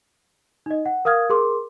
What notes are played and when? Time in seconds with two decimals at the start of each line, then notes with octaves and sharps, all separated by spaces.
0.66 D#4 D#5
0.86 F#5
1.05 A#4 F5 D#6 F6 G#6
1.30 G#4 A#4 C6 D6